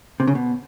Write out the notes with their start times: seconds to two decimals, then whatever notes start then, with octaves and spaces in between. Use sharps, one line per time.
0.20 C3
0.27 C#3
0.35 B2